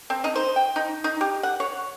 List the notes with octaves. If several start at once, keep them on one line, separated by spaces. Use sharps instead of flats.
C4
D#4
C5
G5
D#4
D#4
G4
F#5
C#5